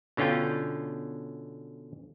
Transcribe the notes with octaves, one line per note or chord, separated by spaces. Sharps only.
B2 D3 C#4 F4 G5